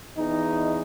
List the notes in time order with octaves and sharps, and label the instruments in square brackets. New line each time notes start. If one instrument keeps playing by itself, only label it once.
[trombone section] E2 D#4